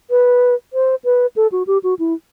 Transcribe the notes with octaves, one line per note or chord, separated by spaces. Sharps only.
B4
C5
B4
A4
F#4
G4
F#4
E4